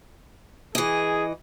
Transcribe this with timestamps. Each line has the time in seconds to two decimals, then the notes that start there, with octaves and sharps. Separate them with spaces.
0.75 E3 G#4 D#5